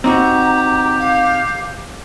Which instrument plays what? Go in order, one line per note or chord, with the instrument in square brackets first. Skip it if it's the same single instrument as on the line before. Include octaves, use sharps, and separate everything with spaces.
[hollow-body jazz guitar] C4 D#4 F#4 [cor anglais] G4 [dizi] A#5
[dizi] F5